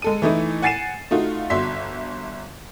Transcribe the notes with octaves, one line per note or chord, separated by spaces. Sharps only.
G#3 A4 D#7
E3 A3 D#4 E4
F#5 G#5 A6 C7 D#7 E7
A3 D#4 F4 F#4
G1 F#4 E5 C6 B6